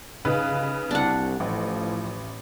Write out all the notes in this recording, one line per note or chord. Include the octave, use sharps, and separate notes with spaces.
G1 C#3 D#4 B4 F5
C2 D4 F#5
A1 A2 F3